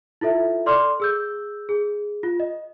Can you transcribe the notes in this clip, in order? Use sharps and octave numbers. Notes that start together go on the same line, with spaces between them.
E4 F4 A4 E5
A4 D5 C6 D6 F6
G#4 E6 G6
G#4
F4
D#5